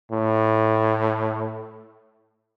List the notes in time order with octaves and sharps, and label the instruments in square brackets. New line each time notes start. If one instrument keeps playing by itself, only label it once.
[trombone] A2